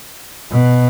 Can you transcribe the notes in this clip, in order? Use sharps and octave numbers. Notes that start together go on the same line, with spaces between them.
B2